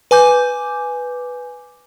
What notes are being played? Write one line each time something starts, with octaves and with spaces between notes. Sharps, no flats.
B4 G#5 D6 G6